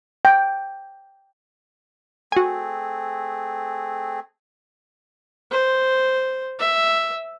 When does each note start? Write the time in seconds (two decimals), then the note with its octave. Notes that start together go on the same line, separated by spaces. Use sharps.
0.25 G5
2.32 A3 C4 F#4 G#4 G#5
5.51 C5
6.59 E5